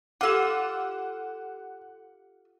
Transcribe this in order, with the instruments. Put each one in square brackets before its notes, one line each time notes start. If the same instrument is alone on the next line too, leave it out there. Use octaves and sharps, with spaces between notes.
[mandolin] F4 E6 [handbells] G4 A4 D6 [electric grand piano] F#5